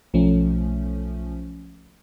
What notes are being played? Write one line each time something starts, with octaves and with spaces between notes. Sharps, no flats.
B1 F3 A3 C#4